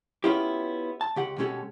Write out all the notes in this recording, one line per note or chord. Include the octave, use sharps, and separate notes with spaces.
B3 C#4 E4 F4 G4
A5
C#2 G4 F#5
B2 G#3 C#4 G4 A4